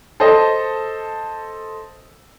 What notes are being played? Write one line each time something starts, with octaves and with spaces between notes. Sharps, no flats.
A4 C5 D#5